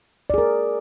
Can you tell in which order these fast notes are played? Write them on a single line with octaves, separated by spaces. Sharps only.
D5 G#4 A#4